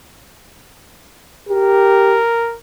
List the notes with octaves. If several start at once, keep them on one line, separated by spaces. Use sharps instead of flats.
G4 A#4